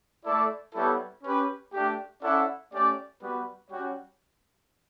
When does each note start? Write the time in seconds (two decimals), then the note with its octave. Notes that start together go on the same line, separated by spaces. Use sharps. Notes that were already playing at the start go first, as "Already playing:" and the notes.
0.24 A3 E4 A4 D5
0.74 G3 B3 E4 A4 C#5
1.23 C#4 G4 B4
1.73 A3 D4 G4
2.22 C#4 E4 A4 D5 F#5
2.71 A3 C#4 G4 D5
3.21 G3 B3 F#4 B4
3.70 G3 C#4 F#4 C#5 G5